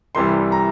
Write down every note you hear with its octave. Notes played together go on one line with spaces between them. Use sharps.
C2 C3 E3 G3 C6
A#5